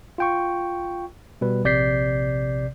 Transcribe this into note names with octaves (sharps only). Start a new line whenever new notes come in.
F4 G5 C#6
B2 G3 B4
A#1 C3 D5 G6 B6 C7